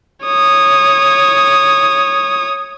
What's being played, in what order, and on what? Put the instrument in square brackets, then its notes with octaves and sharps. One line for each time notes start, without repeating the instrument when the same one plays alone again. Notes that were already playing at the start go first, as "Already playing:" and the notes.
[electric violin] C#5 D#6